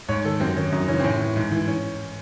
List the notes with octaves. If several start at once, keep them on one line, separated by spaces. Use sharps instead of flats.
G#2 C#5
D#3 A4
F#2 C4
D#3 C#4
F#2 D#4
C#3 E3 C#4
C4
A2 C#4
E3
G#2
E3
C#4